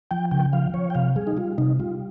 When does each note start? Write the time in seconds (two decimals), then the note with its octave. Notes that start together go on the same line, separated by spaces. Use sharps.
0.11 F3 G5
0.31 C#3 G5
0.53 F3 F5
0.74 F3 C#5
0.90 G5
0.95 C3 F5
1.16 G3 G#4
1.27 D#4
1.37 G3 F4
1.58 C3 D#4
1.79 G3 F4